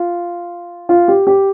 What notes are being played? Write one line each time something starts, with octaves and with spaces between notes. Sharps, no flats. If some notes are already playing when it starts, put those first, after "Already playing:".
Already playing: F4
F4
G4
G4